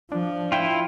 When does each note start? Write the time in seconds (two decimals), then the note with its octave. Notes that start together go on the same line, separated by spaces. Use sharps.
0.12 F3 D4
0.52 E4 F4 G5